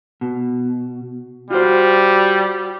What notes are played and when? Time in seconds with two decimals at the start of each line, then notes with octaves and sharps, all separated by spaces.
0.21 B2
1.51 G3 F4 F#4 C5